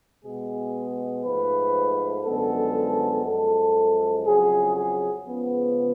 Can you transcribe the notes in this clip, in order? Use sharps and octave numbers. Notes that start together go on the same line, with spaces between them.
B2 G#3 B3 G#4
G#2 F3 A3 B4
F#2 D3 F3 G#3 B3 A4
F#2 F3 G#3 A4
F2 C#3 F#3 G#4
G#4
C#2 C#3 F3 B3